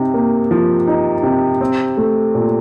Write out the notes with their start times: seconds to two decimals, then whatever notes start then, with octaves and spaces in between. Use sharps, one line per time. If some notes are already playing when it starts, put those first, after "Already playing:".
Already playing: C3 D#4
0.14 A#3
0.51 F3
0.88 D#4
1.23 C3
1.61 C4
1.97 A3
2.35 A#2